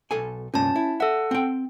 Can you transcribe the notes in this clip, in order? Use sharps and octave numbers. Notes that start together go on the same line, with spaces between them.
B1 A4 G#5
C2 G2 A#2 C#4 A5
E4
A4 E5 F#5
C4 G5